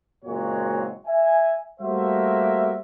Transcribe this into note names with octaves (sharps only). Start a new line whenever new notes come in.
F#1 A#2 G#3 C4 F#4 C#5
E5 G#5
G3 A3 A#3 F#4 C5 E5